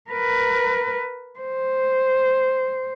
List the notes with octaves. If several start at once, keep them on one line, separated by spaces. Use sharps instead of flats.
A#4 B4
C5